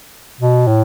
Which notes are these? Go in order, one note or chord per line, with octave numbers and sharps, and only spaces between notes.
B2
A2